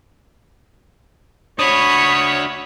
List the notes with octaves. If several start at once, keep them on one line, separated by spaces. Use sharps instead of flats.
D4 F#4 C#5 B5 C#6 D#6